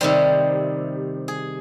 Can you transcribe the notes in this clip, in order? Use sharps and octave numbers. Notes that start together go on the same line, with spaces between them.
C3 D#3 G3 C5
G#4